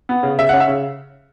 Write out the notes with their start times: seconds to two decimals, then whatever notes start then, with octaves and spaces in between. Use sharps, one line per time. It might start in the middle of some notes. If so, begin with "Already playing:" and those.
0.09 B3
0.23 C#3
0.39 C#3 E5
0.49 C#4 F#5
0.60 E5
0.68 C#3